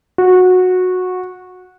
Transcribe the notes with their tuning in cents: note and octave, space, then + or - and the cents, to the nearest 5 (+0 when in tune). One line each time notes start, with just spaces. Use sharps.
F#4 -15